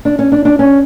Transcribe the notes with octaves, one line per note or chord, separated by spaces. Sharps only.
D4
C#4
D4
D4
C#4